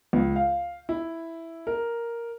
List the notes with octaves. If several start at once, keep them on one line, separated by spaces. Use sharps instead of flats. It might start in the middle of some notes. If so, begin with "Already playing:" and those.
C#2
F5
E4
A#4